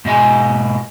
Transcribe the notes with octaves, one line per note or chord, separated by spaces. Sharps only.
G#2 B2 D#5 G#5